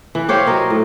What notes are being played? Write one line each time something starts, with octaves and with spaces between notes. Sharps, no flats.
E3
G4 C5 C#5 F5
F#3 D#4 A#4 D#5
A2